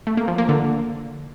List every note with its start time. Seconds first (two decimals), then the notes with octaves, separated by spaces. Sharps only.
0.07 A3
0.17 A#3
0.28 F3
0.38 A#3
0.49 D3